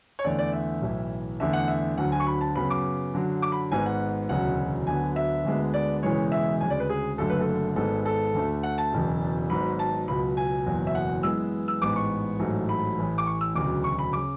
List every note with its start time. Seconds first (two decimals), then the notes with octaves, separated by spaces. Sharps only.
0.19 C#5
0.24 E2 D3 A3 D5
0.39 D5
0.53 E5
0.82 B1 A2 E3
1.40 E2 D3 A3 E5
1.53 F#5
1.68 E5
1.98 D2 D3 F#3 F#5
2.12 G#5
2.20 C#6
2.27 B5
2.41 A5
2.55 F#2 C#3 F#3 B3 B5
2.70 D6
3.13 F#2 D3 F#3
3.42 D6
3.52 B5
3.71 G#1 G#2 G#3 B3 G#5
3.86 F#5
4.29 E1 D2 C#3 F#3 F#5
4.87 D2 D3 F#3 B3 G#5
5.16 E5
5.45 D2 D3 G#3 B3
5.74 D5
6.03 E1 E2 C#3 E3 G#3 C#5
6.32 E5
6.61 D2 C#3 G#3 G#5
6.70 D5
6.80 B4
6.89 G#4
7.18 F#1 F#2 D3 A3 A4
7.30 B4
7.41 A4
7.76 G#1 G#2 G#3 B3 A4
8.06 A4
8.34 D2 D3 A3
8.63 F#5
8.78 A5
8.92 E1 E2 C#3 F#3
9.50 G#1 G#2 F#3 B3 B5
9.79 A5
10.08 C#2 B2 F#3 B5
10.37 G#5
10.66 F#1 E2 B2 F#3
10.87 E5
10.95 F#5
11.23 F#2 E3 G#3 B3 E6
11.68 E6
11.81 A1 G#2 G#3 B3 D6
11.96 C#6
12.39 A1 G#2 F#3 A3
12.69 B5
12.97 A1 A2 E3
13.18 D6
13.26 C#6
13.41 E6
13.55 E1 D2 C#3 F#3 D6
13.84 C#6
13.99 B5
14.13 C#3 D6